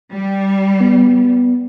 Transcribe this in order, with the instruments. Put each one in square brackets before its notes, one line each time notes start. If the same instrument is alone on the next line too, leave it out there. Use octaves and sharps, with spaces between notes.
[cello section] G3
[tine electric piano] B3